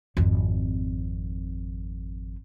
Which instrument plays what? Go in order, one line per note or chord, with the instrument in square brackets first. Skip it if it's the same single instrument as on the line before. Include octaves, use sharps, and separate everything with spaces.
[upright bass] G#1 F2